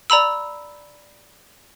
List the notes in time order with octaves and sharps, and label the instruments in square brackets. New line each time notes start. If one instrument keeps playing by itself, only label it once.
[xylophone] D5 A#5 B5 E6